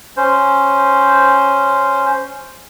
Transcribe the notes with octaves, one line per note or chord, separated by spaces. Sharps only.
C#4 C5